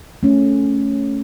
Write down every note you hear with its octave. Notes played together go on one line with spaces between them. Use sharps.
A3 C#4